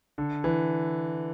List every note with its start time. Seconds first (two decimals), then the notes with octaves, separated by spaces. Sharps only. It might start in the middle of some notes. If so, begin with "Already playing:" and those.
0.18 D3
0.44 E3